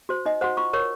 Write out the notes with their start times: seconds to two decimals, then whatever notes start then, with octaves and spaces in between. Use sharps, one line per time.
0.09 F#4 C5
0.26 D#4 D#5
0.41 F#4 C5 F#5
0.57 F4 C#6
0.73 A#4 C#5 C#6